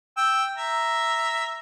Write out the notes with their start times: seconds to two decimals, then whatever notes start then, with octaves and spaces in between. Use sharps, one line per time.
0.17 G5 E6
0.57 E5 A#5